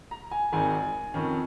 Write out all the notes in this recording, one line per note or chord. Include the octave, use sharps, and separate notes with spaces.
A#5
G#5
G#1 G#2 D#3 G#5
F2 D#3 C#4